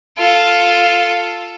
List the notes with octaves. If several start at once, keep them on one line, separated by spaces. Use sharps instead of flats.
F4 A4